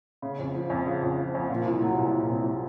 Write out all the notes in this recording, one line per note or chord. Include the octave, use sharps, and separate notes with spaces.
C#3
F2
F3
F2
C#3
F2
F3
F2
A#2
C2
F#3
C2
A#2
C2
F#3